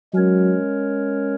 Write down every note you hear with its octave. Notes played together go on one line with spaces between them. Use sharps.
F#3 G#3 C#4 A#4 C#5